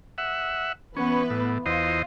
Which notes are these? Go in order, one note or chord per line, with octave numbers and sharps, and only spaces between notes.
E5 F#5
E3 B3 C#4 B4
A2
E2 F4 C5 D#5